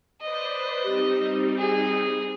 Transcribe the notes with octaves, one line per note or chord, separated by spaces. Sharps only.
B4 C5 D5 D#5
G3 C4 D#4 G4
G#4